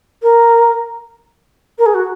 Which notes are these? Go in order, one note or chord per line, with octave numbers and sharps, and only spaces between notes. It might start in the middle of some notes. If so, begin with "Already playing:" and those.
A#4
A#4
G#4
F#4